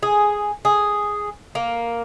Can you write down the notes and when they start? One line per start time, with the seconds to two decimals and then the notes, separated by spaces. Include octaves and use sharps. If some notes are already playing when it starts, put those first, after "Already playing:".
0.03 G#4
0.65 G#4
1.55 A#3